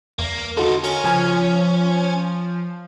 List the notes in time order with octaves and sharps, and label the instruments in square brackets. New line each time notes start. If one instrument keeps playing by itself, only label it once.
[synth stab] E2 [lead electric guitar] A#3
[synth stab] D3 F#4 A4 [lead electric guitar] D#4 F4
[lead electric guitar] C#4 [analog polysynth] A#4
[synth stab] C#3 G#5 F6 [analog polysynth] F3